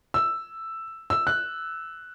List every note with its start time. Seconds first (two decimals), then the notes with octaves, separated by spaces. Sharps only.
0.14 E6
1.10 E6
1.27 F#6